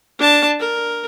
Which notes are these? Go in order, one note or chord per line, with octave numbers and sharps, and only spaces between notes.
D4 A5
A#4